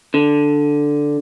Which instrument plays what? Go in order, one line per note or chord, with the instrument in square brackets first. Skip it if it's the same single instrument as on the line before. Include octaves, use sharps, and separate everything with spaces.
[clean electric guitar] D3